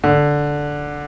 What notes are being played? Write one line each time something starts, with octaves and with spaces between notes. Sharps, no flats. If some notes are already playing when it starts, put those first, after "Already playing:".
D3